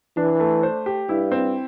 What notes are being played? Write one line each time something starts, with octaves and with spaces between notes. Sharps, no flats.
E3 D4
A3
C5
G4
G2 E4
C4